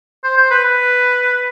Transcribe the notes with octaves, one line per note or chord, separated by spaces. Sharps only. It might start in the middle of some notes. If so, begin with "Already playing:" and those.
C5
C5
B4
B4